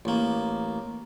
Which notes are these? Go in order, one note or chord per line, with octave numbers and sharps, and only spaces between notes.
A1 A#3